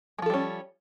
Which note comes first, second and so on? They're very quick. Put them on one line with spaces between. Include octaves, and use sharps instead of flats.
G#3 F3 A4 G3 C#4